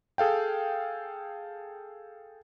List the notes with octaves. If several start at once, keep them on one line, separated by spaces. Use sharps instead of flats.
G#4 A4 F5 G5